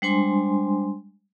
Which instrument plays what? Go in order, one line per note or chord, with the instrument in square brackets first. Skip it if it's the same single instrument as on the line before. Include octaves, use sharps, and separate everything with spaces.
[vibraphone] G3 G#3 D4 C5 G#5 C6